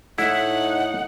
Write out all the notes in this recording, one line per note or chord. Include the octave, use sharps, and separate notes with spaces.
A2 D#4 E4 E5 F#5